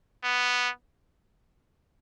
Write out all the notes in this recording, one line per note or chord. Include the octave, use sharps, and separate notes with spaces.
B3